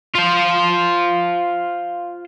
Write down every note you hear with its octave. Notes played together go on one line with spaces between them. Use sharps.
F4 C5